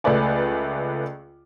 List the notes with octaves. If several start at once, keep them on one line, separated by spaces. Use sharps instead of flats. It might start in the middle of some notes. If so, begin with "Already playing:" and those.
C#2 A3 B4 D5 G#5